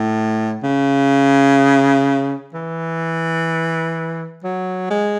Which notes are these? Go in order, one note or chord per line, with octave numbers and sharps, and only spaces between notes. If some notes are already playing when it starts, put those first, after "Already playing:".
Already playing: A2
C#3
E3
F#3
G#3